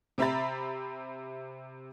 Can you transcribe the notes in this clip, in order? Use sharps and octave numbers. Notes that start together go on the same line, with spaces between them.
C3 C4 E5 A#5 B5 A6